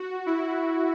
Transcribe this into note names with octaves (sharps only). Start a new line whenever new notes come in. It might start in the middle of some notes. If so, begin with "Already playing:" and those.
Already playing: F#4
E4